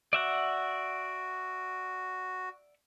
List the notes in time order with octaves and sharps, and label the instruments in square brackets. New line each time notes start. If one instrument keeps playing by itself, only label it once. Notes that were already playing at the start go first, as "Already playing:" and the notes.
[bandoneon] F#4 [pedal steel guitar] D5 E5 F#5